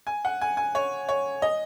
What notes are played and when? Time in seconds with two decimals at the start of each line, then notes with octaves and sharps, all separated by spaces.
0.07 G#5
0.25 F#5
0.41 G#5
0.57 G#5
0.75 C#5
1.09 C#5
1.42 D#5